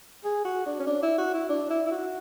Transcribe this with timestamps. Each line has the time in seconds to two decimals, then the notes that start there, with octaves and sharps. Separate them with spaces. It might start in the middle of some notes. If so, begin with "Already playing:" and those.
0.25 G#4
0.45 F#4
0.66 D4
0.79 C#4
0.87 D4
1.02 E4
1.18 F#4
1.34 E4
1.49 D4
1.70 E4
1.87 E4
1.91 F#4